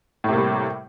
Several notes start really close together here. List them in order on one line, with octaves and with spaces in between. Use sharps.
A2 C3 A#3 G3